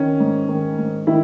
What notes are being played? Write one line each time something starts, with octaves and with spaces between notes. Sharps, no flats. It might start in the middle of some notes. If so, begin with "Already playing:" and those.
Already playing: D#3 C#4
G#2
D#3
G#2
D#3 E4